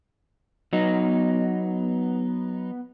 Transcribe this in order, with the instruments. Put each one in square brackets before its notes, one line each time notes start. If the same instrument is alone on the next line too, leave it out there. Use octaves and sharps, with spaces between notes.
[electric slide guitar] F#3 D#4 [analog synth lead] B3